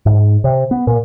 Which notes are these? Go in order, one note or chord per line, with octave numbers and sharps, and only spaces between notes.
G#2
C3
B3
A#2